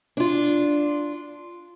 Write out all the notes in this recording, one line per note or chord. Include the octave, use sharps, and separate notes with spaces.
D4 F4